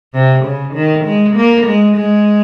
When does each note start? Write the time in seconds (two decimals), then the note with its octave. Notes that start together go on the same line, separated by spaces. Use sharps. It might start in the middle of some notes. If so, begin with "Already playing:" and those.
0.14 C3
0.44 C#3
0.74 D#3
1.05 G#3
1.36 A#3
1.66 G#3
1.97 G#3